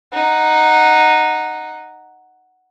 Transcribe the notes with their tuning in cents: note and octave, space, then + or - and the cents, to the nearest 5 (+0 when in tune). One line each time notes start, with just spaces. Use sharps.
D#4 -5 F#5 +0